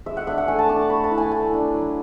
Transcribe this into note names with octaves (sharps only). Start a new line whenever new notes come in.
G#3 E5
F#5
D4 E5
F#5
A3 G#5
A5
D4 D6
C#6
A3 B5
A5
E4
G#5
A3 G#5
D4
F#3